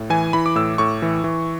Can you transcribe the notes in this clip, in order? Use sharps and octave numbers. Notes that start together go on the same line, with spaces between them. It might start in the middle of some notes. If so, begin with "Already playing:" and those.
Already playing: A2
E3 G#5
E3 B5
D6
A2 E6
A2 C#6
E3
E3